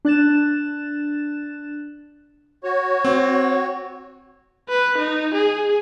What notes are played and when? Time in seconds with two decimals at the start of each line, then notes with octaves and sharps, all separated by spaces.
0.05 D4 F#6 A6 E7
2.64 F#4 C#5
3.05 C4
4.69 B4
4.98 D#4
5.34 G#4